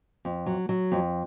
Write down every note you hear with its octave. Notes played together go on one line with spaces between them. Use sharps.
F2
F#3
F#3
F2